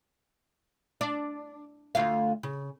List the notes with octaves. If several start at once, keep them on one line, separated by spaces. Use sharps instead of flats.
D4
D2 F4 F5
C#3